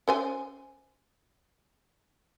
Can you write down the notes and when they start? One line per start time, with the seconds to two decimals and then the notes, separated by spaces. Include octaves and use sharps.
0.08 C#4 C5 G#5